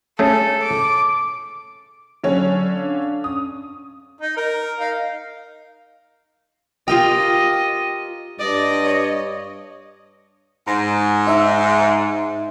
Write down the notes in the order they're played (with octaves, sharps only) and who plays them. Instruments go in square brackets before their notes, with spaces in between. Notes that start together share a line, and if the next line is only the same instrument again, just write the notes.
[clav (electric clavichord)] A3 C#4 G#4 [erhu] A4
[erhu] D6
[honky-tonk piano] D3 C#4 C#5 [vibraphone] F#3
[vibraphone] D4 F5
[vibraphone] C#4 [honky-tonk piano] D#6
[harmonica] D#4
A#4
D#4 F5
[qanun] F4 G4 A#4 [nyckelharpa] D#5 [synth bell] G5
[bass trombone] G2 [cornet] D5 [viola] D#5
[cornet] C#5
[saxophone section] G#2 [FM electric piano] A#5
[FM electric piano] D#4 E5